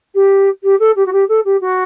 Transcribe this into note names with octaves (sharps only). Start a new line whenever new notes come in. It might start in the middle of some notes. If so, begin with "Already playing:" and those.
G4
G4
A4
G4
F#4
G4
A4
G4
F#4